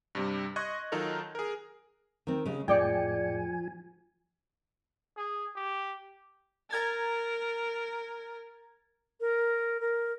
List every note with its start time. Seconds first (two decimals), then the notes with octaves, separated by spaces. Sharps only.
0.15 G2 C3 G3
0.56 D#5 C6 C#6 F#6 G#6 A#6
0.92 D#3 F#3 D#4 F4 A4 A#4
1.35 G#4 A#4
2.27 D#3 C4
2.46 C#3 G#3
2.68 F2 A2 F3 G#3 D5 G5 G#5 C#7
5.17 G#4
5.56 G4
6.71 A#4 A#5 G#6 A6
9.20 A#4
9.80 A#4